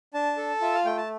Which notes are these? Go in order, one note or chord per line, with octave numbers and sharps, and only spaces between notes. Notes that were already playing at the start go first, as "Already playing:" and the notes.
D4 A5
A4
F4 E5
F5
A3 G5
A5